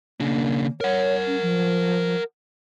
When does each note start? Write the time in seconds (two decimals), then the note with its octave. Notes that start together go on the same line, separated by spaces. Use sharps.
0.20 C#3 A#3 D4
0.81 A#4 C#5 F#5
1.27 C#4
1.41 F3